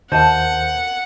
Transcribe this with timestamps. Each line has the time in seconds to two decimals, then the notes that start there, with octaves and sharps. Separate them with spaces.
0.12 D#2 A#3 C5 D#5 F#5 A5 G6